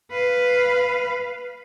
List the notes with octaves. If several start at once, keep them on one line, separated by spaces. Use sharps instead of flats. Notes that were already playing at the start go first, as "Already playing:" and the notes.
B4 F5